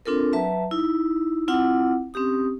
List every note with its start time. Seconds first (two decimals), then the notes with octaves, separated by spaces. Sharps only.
0.06 C4 D4 F4 A4 A#4
0.33 F#3 B4 E5 A5 A#5
0.71 D#4 E4
1.48 C4 E4 F4 F#5 D6
2.14 C4 C#4 G4 D#6